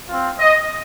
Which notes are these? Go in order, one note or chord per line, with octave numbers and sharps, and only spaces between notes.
C4 F4
D#5